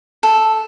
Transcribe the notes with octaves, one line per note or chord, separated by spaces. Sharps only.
A4